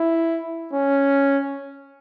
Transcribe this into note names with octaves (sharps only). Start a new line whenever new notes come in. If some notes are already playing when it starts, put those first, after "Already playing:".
Already playing: E4
C#4